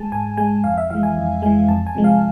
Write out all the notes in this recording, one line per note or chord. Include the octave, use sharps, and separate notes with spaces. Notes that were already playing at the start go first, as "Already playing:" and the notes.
Already playing: G#3 G#5 A5
G#2 G#5
G#3 G#5
F2 F5
E5
E3 G#3 F5
G#5
F2
E3 G#3 G#5
F2 A5
G#5
C3 F3 G#3
F5